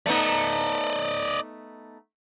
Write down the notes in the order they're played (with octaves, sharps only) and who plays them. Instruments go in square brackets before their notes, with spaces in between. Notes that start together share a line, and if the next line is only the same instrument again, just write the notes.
[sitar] A3 B3 D#4 [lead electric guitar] D5 D#5